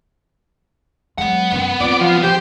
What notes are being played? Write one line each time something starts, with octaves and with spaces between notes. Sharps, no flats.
F#3 G#3 B3 F#5
D1 F#2
C4 F4 D5
F3
F3 G4 C5